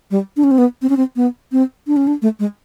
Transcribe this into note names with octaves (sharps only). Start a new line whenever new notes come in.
G3
D4
C#4
C4
B3
C4
C#4
C4
B3
C4
D4
C#4
D4
A3
G#3